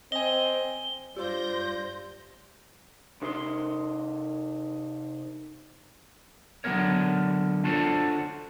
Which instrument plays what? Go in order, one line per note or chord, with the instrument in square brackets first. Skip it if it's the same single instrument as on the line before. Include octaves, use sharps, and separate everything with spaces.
[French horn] C4 [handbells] D#5 G#5 [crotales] G7
[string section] G2 G6 A#6 [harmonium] F4 D5 [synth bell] G4 C6 [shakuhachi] C5
[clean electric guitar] C3 D#4 A#4 B4 C6
D3 F#3 B3 C4 A#4 C#5
D4 F4 F#4 A4 C5 C#5